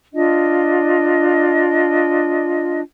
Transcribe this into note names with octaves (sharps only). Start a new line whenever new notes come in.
D4 F4 D#5